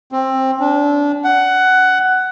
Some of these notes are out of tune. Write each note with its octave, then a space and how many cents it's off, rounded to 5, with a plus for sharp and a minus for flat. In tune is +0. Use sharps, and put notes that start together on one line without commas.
C4 +15
D4 -25
F#5 +10